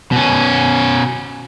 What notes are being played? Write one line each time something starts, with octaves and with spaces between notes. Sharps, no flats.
B2 C#4